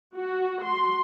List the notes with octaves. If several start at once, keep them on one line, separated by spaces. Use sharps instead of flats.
F#4
C6